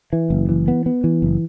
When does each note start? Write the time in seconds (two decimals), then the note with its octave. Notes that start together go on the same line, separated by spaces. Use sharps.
0.13 E3
0.30 F#1
0.49 E3
0.68 B3
0.86 B3
1.04 E3
1.22 F#1